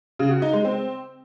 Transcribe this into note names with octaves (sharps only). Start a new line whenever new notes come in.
C#3
F#4
D#4
G#3
C4